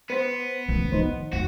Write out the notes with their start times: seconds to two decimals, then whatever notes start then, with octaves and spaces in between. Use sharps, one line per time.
0.10 B3 B4 C5
0.69 A2 D#3 C#4
0.92 D#3 D#4 C5
1.33 F2 F#4